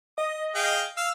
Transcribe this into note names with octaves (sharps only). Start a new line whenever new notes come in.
D#5 D#6
G#4 F5 G5
F5 E6